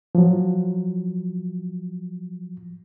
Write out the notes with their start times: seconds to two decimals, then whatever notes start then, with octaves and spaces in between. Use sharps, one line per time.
0.15 F3 F#3